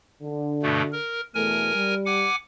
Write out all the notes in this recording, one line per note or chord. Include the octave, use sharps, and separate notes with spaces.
D3
G2 B2 A3
A#4
E2 B2 A3 A#4 G#5
G3
F#5 G#5 D6